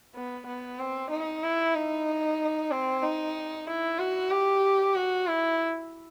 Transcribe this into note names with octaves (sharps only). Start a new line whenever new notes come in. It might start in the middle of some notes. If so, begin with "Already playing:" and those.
B3
B3
C4
D#4
E4
D#4
C4
D#4
E4
F#4
G4
F#4
E4